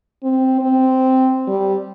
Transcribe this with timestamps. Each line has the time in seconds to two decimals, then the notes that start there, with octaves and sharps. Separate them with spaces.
0.23 C4
0.61 C4
1.48 G3